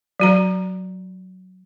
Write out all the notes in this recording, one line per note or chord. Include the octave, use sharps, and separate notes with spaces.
F#3 F#4 A#5